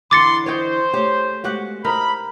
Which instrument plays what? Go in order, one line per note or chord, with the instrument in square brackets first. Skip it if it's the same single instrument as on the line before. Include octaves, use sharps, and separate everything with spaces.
[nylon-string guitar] D3 E3 [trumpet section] B5 C6 [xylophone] D6 A6 C#7
[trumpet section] C5 [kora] C#5 D#5 G5
[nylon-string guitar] A3 G#4 C#5 [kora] G4
[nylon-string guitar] G#3 A3 B3 [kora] F#4 G4 F#5
[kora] D#4 A#4 [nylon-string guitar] E4 C5 [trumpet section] B5